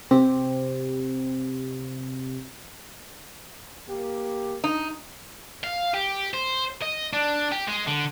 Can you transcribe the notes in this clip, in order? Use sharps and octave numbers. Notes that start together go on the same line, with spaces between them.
C3 C4 G4
A#3 G4
D#4
F5
G4
C5
D#5
D4
G4
G#3
D3